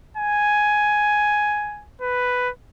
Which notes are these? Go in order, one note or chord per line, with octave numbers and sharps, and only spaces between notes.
G#5
B4